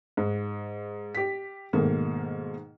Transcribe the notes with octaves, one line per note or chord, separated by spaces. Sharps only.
G#2
G4 B6
G#2 B2 D#3 A3 A#3